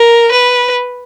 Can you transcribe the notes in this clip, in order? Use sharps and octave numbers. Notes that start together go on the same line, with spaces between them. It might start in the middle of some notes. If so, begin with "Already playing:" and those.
Already playing: A#4
B4